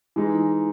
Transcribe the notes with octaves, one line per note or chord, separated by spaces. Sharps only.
E3 G#3 D#4